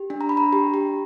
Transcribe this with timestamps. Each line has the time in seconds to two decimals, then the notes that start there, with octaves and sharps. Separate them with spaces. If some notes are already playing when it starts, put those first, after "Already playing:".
Already playing: G4
0.10 D4
0.21 A#5
0.29 D4 B5
0.37 A#5
0.52 G4
0.74 G4